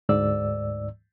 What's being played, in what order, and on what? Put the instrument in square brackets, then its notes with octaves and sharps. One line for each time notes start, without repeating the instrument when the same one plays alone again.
[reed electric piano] D2 G#2 D5 E6